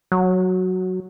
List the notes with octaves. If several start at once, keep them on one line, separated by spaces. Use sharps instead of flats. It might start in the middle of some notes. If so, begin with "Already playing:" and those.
F#3